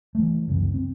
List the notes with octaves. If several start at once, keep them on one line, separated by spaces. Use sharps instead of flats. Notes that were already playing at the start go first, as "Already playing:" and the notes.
E3 A3
C#2 F#2 C3 E3
C4